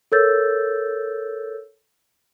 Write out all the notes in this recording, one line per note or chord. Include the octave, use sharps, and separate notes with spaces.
A4 A#4 C#5 E6 G6 A6